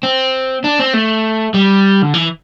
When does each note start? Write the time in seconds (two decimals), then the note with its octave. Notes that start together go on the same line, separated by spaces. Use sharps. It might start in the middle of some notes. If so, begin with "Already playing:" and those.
0.03 C4
0.64 D4
0.79 C4
0.94 A3
1.54 G3
2.02 D3
2.14 E3